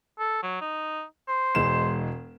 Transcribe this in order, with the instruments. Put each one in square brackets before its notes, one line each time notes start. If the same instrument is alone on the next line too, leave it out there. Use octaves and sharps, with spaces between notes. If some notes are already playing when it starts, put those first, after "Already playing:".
[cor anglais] A4
F#3
D#4
C5
[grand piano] E1 G#3 E7